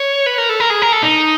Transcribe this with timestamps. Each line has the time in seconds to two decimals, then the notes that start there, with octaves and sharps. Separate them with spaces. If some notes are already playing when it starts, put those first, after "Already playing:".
Already playing: C#5
0.26 B4
0.38 A#4
0.49 A4
0.60 A#4
0.70 G#4
0.82 A#4
0.92 A4
1.03 D#4